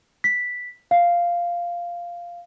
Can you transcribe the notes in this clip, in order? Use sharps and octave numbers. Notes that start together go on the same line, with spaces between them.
B6
F5